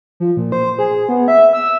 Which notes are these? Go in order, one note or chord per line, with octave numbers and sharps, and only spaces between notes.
F3
A#2
C5
G#4
B3
E5
E6